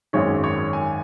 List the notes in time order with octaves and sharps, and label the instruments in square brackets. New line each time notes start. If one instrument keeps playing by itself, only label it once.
[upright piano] G#1 F#2 D#3 G#3 C#5
C#5
G#5